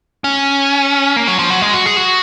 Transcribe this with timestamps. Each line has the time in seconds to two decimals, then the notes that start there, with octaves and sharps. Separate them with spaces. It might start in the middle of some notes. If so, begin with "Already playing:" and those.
0.24 C#4
1.16 A#3
1.27 F#3
1.39 F3
1.50 F#3
1.62 G#3
1.74 F#4
1.86 G#4
1.97 F#4